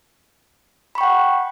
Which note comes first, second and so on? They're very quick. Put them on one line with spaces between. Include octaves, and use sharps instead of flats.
B5 C#6 G5 F#5